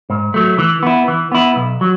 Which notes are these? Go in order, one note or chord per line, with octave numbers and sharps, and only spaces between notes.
G#2
F#3 A3
E3
B3 E4
E3
B3 E4
B1
F#3